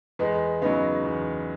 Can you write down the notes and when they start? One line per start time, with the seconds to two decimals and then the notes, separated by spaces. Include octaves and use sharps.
0.19 E2 G#3 B3
0.61 C#3 F#3 B3 D#4
1.04 E2